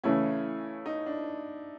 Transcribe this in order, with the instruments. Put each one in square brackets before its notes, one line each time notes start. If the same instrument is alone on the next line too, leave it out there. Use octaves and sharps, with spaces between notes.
[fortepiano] C#3 E3 A3 C#4 [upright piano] E4
[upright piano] D#4
D4